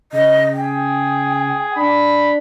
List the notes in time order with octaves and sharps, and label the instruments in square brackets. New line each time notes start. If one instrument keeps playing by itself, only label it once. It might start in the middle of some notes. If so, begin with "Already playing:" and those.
[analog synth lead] C#3 [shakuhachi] D#5
[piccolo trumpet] G#4 [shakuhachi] G5
[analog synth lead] D4 [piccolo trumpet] B5